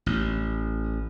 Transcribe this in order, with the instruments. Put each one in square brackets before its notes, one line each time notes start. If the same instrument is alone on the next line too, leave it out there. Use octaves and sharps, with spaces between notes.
[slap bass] A1